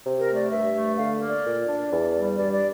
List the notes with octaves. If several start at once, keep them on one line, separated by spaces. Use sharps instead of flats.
C3
A#4
A3
D5
G2 E5
A3
D3 F5
A#3
D5
A#2
D4
E2
G3
G2 D5
D5